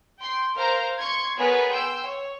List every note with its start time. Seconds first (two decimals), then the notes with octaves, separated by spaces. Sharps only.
0.20 G5 C6
0.56 A#4 C5 F5 A#5
0.99 C6 C#6 G#6
1.37 B3 G#4 A#4 B4 C#5
1.70 G5 C6 E6
2.04 C#5